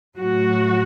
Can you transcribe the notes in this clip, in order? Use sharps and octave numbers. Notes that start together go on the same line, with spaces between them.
A2 F#3 F#4